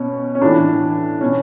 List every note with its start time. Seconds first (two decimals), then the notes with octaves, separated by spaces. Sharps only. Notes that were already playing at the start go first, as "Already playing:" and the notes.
Already playing: B2 C#4
0.35 C#4
0.42 A2 E3 D4
1.21 B2 C#4